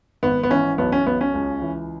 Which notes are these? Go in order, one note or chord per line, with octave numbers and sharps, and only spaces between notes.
G#1 B3
B3
E3 C#4
B1 B3
C#4
B1 B3
C#4
C#2
E3